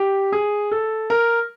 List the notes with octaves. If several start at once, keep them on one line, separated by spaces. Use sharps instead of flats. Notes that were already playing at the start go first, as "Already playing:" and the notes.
Already playing: G4
G#4
A4
A#4